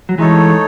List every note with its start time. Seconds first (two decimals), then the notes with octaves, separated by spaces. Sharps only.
0.09 F#3
0.18 E3 G#3 A3 D#4 A4 C#5